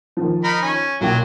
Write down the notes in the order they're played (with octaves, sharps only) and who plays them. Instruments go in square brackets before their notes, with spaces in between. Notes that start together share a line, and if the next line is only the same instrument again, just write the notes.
[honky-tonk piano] D#3 F3
[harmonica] D#4 A#4 B5
C#4
[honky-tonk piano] B1 A#2 G5 [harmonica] F#3